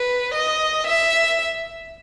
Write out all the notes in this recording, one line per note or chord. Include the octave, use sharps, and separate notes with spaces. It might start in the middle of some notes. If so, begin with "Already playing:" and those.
Already playing: B4
D#5
E5